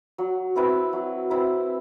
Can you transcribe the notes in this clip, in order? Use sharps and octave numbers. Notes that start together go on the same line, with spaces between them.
F#3
C4 E4 B4
F#3
C4 E4 B4